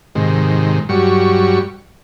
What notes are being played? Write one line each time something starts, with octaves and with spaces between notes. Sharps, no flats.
G#2 C3 D#3
G2 F#3 G3 C#6